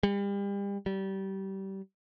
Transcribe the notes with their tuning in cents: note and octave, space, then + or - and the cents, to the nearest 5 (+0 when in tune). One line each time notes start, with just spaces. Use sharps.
G3 +35
G3 -25